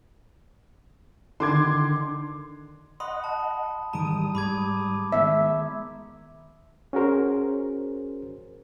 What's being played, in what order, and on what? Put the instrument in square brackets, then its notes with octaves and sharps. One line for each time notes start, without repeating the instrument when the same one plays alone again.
[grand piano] D3 D#3 [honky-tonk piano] C6 D6 G#6
[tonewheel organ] D#5 F#5 [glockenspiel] B5 C6 D#6
[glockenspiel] A5
[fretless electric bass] G#2 D#3 E3 [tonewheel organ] G3 D#6 [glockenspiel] A#5 D7
[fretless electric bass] G#2 [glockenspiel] B5 D6 G#6
[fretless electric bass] D#3 B3 [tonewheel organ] G#3 [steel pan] E5
[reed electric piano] C#4 F#4 G#4 A#4 C5